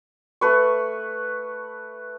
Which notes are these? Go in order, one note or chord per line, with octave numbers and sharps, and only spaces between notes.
A3 B4 C#6